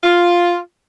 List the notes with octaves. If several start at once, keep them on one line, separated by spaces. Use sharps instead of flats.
F4